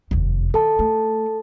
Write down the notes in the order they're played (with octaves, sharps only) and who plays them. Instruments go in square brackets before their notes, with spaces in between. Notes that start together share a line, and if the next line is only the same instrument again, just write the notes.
[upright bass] F1 D#2
[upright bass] D#3 [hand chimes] A4 A5
[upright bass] A3